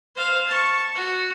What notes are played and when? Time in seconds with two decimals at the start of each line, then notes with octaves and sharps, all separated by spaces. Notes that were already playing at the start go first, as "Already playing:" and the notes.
0.15 C5 F5
0.47 A5 C#6
0.95 F#4